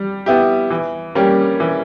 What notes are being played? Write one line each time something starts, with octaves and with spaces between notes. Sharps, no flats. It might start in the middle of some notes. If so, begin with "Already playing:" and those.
Already playing: G3
B3 E4 G4
E3
G3 A#3 C#4 G4
E3